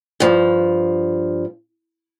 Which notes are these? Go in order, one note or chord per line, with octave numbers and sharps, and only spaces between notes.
G2 F3